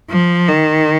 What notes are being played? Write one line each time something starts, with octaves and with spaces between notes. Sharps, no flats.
F3
D#3